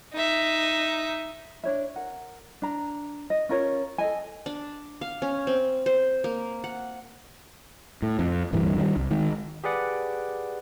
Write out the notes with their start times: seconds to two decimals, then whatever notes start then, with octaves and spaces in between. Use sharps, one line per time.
0.13 D#4 E5
1.64 D4 C#5 E5
1.96 A#4 F#5
2.62 D4 A#5
3.30 D#5
3.49 C#4 F4 A#4 C#5
3.98 A4 D#5 G#5
4.46 D4
5.01 F5
5.22 C#4
5.47 C4
5.86 C5
6.24 A#3
6.64 F#5
8.02 A2
8.19 F2
8.53 D1 G2 E3 G3
8.78 D#3 F#3 G3
8.96 C2
9.11 D#3 G#3
9.64 G4 G#4 B4 D5 F#5